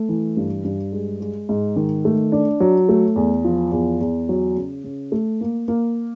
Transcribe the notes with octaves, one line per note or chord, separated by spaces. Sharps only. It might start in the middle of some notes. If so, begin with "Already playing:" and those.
Already playing: A3
E3
G2
G2
G#3
G#3
G#2
D#3
A3
D4
F#3
A3
E2
F3
E2
E2
F#3
C#3
C#3
A3
A#3
A#3